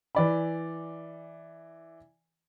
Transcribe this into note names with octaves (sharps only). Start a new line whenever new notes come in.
E3 D5 B5